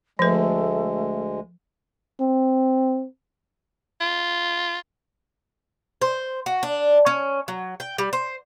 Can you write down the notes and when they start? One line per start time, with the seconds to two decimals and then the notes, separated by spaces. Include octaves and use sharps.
0.19 D2 F3 G#3 A3 B4
2.21 C4
4.01 F4
6.02 C5
6.46 F#4
6.63 D4
7.06 C#4
7.48 F#3
7.80 G5
7.98 G3
8.13 C5